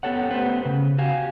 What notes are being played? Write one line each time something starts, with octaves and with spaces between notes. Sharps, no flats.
B3 G4 A4 C#5 F#5
A3 B3 G4 B4 C5 F#5
C#3
F#4 G4 F5 G#5